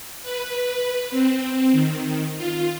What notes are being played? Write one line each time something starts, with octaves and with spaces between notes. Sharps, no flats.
B4
C4
D#3
F4